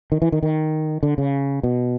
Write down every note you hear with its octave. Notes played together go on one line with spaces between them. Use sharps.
D#3
E3
D#3
D#3
D3
C#3
B2